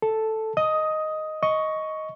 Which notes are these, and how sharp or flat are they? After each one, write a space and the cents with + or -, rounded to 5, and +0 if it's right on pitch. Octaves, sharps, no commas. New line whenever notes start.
A4 +0 A5 +0
D#5 +0 D#6 +10
D#5 +10 C#6 +5